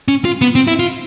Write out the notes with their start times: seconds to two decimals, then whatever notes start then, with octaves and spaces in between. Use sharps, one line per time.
0.08 C#4
0.25 F4
0.42 B3
0.55 C4
0.67 E4
0.79 F4